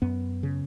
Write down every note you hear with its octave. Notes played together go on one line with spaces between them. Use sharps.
F#2 B3
C#3